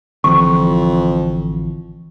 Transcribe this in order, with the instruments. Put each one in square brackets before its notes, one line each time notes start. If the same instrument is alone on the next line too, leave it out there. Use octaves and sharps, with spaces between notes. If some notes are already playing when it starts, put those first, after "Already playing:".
[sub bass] A1 [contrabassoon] F2 [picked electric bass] D3 E3 F3 [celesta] C#6